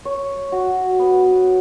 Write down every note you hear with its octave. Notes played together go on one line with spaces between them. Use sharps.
C#5
F#4
B3